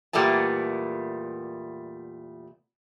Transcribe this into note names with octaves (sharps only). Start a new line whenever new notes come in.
E2 A#2 G3 A3 B3 A5